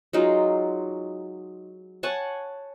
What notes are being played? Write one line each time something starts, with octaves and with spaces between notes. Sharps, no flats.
F#3 G#3 D#4 F4
C#5 F#5 G#5 A5